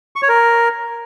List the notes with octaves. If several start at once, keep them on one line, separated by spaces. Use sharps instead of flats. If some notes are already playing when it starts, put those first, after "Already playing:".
C#6
C#5
A#4